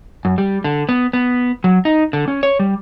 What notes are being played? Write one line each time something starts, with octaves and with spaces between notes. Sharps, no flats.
F#2
G3
D3
B3
B3
F#3
D#4
D3
C#4
C#5
G3